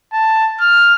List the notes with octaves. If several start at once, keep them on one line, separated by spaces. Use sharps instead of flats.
A5
F6